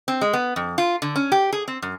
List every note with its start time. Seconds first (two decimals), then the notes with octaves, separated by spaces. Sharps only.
0.08 C4
0.21 G#3
0.33 B3
0.56 F2
0.78 F4
1.02 D3
1.16 C#4
1.32 G4
1.53 G#4
1.68 C4
1.82 F#2